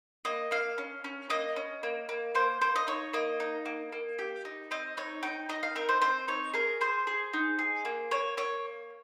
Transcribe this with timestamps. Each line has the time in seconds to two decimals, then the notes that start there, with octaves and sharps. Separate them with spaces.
0.25 A#3 D#5
0.51 A#3 F5
0.78 C#4
1.04 C#4
1.30 A#3 D#5
1.56 C#4
1.83 A#3
2.09 A#3
2.35 A#3 C5
2.61 A#3 C5
2.76 D#5
2.87 D#4 C#5
3.13 A#3 D#5
3.40 D#4
3.66 A#3
3.92 A#3
4.19 G4
4.45 D#4
4.71 C4 D#5
4.97 D#4 C#5
5.23 D#4 G5
5.49 D#4 D#5
5.63 F5
5.75 C4 A#4
5.89 C5
6.02 C4 C5
6.28 D#4 C#5
6.54 G#4 A#4
6.81 G#4 C5
7.07 G#4
7.33 D#4
7.59 G#4
7.85 A#3
8.11 A#3 C#5
8.37 A#3 C#5